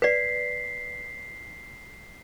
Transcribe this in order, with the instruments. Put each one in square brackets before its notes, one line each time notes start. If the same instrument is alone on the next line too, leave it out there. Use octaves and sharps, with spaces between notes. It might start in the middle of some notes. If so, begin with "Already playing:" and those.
[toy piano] B4 D5 [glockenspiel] B6 C7